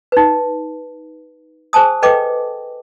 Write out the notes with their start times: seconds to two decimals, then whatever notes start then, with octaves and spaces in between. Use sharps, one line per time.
0.12 D#4 B4
1.73 G#4 C5 G#5 A5 D#6
2.02 A4 B4 D#5 G5 D6